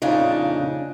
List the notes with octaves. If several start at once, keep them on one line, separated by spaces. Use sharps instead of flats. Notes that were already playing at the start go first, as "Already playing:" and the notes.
F2 A#2 C#3 D4 D#4